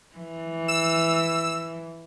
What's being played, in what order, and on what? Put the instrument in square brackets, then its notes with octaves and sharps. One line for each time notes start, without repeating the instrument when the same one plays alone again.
[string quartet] E3
[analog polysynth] E6